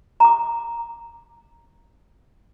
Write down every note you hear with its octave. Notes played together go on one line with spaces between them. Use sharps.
A#5 D6